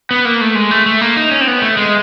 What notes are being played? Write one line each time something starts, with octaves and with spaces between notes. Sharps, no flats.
B3
A#3
A3
G#3
A3
A3
A#3
D#4
C#4
C4
B3
A3
G#3